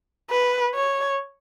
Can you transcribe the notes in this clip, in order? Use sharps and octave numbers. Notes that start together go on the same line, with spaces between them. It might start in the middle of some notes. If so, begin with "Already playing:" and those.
B4
C#5